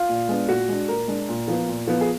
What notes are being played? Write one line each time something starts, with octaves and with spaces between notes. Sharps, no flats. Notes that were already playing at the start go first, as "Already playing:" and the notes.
Already playing: F4
A#2
G#3 B3 D4
A#2 F#4
G#3 D4
A#2 A#4
G#3 D4
A#2
F3 B3
A#2
F3 B3
G#4